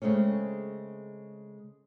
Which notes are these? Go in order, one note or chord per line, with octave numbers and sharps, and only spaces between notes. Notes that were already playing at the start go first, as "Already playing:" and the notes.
C#3 G#3 A3 C4 C#4